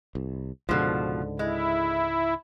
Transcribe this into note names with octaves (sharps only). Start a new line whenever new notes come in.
C2
C#2 G#2 B2 D3 F3
G#3 E4